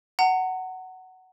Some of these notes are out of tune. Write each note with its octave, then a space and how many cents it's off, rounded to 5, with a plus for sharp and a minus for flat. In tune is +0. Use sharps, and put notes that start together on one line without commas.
F#5 +10 A#5 -35